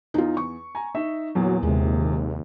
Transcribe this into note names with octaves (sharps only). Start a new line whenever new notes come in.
E2 D#4 F4
C#6
G#5 A#5
D#4 E5
E2 A#2 F#3
D#2 C3 G#3